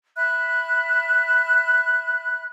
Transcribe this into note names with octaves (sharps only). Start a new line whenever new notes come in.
E5 B5 F#6